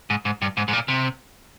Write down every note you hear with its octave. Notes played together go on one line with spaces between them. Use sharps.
G#2
G#2
G2
G#2
G#2
A#2
C3